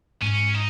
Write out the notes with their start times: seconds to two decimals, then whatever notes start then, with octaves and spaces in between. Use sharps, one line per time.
0.22 G#2 C#4
0.55 D#4